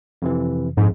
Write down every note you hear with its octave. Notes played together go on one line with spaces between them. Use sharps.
F2 C3 E3
A#1 F2 G#2